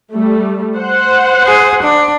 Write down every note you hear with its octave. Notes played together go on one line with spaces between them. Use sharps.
G3 A3
C5 F#5
G#4
D4